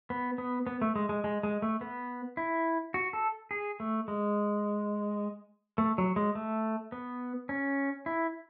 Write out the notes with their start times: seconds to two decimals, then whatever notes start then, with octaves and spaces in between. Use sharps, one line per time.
0.10 B3
0.38 B3
0.67 B3
0.82 A3
0.96 G#3
1.09 G#3
1.24 G#3
1.43 G#3
1.62 A3
1.81 B3
2.37 E4
2.94 F#4
3.13 A4
3.51 G#4
3.80 A3
4.08 G#3
5.78 A3
5.98 F#3
6.16 G#3
6.35 A3
6.92 B3
7.49 C#4
8.06 E4